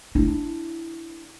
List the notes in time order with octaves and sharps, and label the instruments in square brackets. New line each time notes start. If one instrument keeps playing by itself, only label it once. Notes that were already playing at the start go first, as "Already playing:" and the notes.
[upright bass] D4 E4